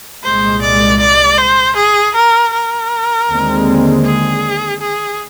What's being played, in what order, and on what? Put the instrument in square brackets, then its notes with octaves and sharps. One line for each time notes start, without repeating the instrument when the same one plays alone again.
[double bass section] C2 A#2 G#3 [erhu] C5
[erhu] D5
D5
C5
G#4
A#4
A#4
[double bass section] D#2 D3 G#3 C4
[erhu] G#4
G#4